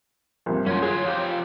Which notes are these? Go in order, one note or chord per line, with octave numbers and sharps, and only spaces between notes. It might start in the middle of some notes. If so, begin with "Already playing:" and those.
A#1 G2 C3
F#2 C#4 F4
F#3 F4 G#4 C#5
F3 F4 G4